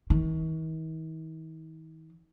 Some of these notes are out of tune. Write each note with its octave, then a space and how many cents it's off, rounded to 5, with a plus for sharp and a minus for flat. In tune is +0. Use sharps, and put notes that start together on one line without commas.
D#3 +45